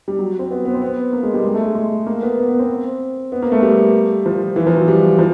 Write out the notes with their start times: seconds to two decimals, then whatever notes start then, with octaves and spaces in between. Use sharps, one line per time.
0.08 G3
0.19 F#3
0.39 C4
0.51 B3
0.65 B3
0.74 C4
0.82 B3
1.13 A#3
1.23 G#3
1.34 G3
1.45 G#3
1.54 A3
1.65 G#3
1.75 G#3
2.07 A#3
2.22 B3
2.38 B3
2.49 B3
2.59 C4
3.32 B3
3.42 A#3
3.52 A3
3.62 G3
4.26 F3
4.56 E3
4.67 F3
4.77 F#3
4.88 G3
5.19 F3